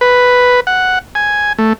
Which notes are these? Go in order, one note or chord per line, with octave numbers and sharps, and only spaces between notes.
B4
F#5
G#5
A3